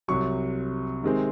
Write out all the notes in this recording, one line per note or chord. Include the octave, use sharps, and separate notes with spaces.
C2 C3 F#3 C#6
C3 D#3 G#3 C4